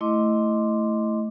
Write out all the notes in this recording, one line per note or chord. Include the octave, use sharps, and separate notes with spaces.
A3 E4 D#5 C6 D6